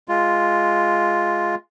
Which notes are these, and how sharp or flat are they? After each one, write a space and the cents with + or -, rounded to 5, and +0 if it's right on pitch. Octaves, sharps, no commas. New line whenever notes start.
G#3 +0 F4 +0